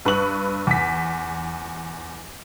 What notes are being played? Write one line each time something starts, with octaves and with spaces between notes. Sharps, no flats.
G2 B4 C#6 F#7
E2 B6